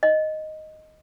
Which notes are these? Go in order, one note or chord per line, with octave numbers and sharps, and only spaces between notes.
D#5